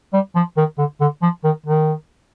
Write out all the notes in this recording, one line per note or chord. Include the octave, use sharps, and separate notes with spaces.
G3
F3
D#3
D3
D3
F3
D#3
D#3